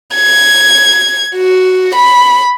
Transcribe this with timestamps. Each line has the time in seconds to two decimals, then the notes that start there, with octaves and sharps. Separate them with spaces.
0.15 G#6
1.36 F#4
1.95 B5